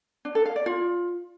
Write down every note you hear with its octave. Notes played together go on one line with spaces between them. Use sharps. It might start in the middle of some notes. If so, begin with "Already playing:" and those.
D4
A4
F5
D5
F4